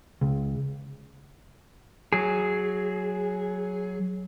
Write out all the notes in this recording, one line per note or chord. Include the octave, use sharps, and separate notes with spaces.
C#2
F#3 G#4